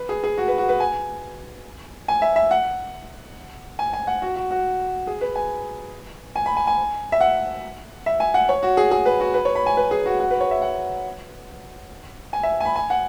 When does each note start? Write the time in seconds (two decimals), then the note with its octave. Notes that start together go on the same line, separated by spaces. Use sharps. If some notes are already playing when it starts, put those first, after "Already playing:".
Already playing: B4
0.09 G#4
0.24 G#4
0.38 F#4
0.48 B4
0.58 F#4
0.69 B4
0.80 G#5
2.08 G#5
2.22 E5
2.36 E5
2.51 F#5
3.79 G#5
3.93 G#5
4.07 F#5
4.22 F#4
4.36 F#4
4.51 F#4
5.07 G#4
5.21 B4
5.36 G#5
6.36 G#5
6.46 B5
6.57 G#5
6.67 G#5
7.12 E5
7.20 F#5
8.06 E5
8.20 G#5
8.34 F#5
8.49 C#5
8.63 F#4
8.77 G#4
8.91 G#4
9.06 B4
9.20 F#4
9.34 B4
9.45 C#5
9.55 B5
9.66 G#5
9.77 B4
9.91 G#4
10.06 F#4
10.19 F#4
10.31 B4
10.40 C#5
10.51 E5
10.62 F#5
12.33 G#5
12.43 E5
12.60 G#5
12.65 B5
12.76 G#5
12.90 F#5